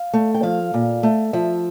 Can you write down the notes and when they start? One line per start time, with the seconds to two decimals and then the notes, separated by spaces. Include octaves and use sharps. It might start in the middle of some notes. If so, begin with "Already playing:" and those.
Already playing: F5
0.14 A3
0.34 G5
0.43 F3 F5
0.74 A#2
1.03 A3
1.33 F3 E5